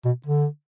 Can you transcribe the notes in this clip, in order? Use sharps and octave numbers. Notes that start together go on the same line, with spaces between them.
B2
D3